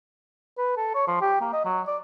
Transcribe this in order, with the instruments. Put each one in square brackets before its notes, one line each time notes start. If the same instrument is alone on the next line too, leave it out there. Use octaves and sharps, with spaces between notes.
[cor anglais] B4
A4
C#5
F3
G4
A#3
D#5
F#3
D5